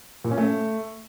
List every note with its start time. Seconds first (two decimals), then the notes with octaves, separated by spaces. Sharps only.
0.24 A#2
0.31 C#4
0.38 A3